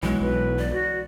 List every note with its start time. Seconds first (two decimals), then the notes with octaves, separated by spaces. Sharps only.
0.03 B1 E3 F#3 G#3
0.21 B1 B4
0.58 D5
0.72 F#4